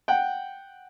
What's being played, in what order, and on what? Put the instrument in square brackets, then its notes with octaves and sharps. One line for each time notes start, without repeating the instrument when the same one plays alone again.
[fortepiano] F#5 G5